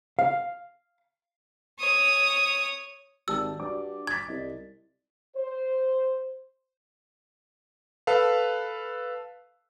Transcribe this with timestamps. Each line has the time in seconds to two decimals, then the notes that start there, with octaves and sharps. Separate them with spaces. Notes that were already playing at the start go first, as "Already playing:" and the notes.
0.19 F5
1.79 C#5 D#6
3.28 G#1 G4 D5 A5 E6
3.60 G2 F#4 D5 D6
4.07 D6 G#6 A6 B6
4.28 C2 D5 D#5
5.37 C5
8.07 A4 B4 F5